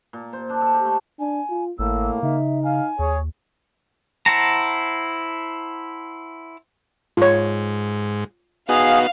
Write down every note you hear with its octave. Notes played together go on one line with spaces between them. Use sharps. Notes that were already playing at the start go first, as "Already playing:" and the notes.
A#2
C5
D4
A4
G4
A3
D4 G#5
F4
G#1 A2 A#3 E6
C#3 D#4 E5
F5 G#5
D#2 G#4 C#5
E4 C5 F#5 A5 A#5
G#2 F4 C#5
B3 D#4 F#4 G#4 F5